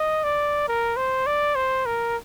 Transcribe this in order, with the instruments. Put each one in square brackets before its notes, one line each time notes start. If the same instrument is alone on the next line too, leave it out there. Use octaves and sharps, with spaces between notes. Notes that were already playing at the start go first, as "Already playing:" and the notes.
Already playing: [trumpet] D#5
D5
A#4
C5
D5
C5
A#4